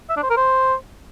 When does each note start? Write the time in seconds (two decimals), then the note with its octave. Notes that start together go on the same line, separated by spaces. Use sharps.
0.09 E5
0.16 D4
0.23 C5
0.30 A#4
0.37 C5